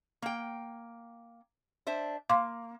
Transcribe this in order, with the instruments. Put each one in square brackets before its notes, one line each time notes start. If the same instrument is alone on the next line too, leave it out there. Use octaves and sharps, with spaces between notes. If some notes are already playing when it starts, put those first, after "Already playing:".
[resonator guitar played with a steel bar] A#3 G5
D4 C5 E5
[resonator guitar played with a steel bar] A#3 [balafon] F5 C6 D6